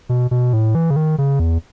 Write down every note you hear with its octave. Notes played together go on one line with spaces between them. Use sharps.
B2
B2
A2
E3
C#3
D#3
C#3
E2